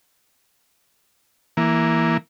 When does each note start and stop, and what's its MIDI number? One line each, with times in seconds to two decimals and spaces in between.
1.57 2.17 52
1.57 2.17 58